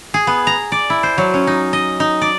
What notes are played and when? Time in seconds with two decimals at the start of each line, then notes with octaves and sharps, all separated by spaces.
0.14 G#4
0.27 B3
0.47 A#5
0.72 D5
0.90 E4
1.03 C5
1.18 F#3
1.34 C#4
1.47 D#4
1.73 D#5
2.00 D#4
2.22 D5